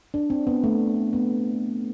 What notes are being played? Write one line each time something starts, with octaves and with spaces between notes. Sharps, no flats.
D4
C4
B3
A3
B3